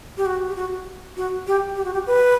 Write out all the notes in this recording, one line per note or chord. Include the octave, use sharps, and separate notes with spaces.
G4
F#4
G4
F#4
F#4
G4
G4
F#4
G4
B4